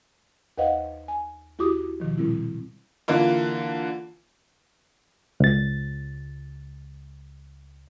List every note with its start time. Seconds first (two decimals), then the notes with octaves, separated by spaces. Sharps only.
0.58 D#2 B4 C5 D#5 F5 F#5
1.08 G#5
1.58 D#2 E4 F#4 G4 D6 D#6
1.79 E4
2.00 B2 D#3 F3
2.18 A#2 G3 C4 E4
3.08 D3 E3 A#3 F4
5.40 C#2 A6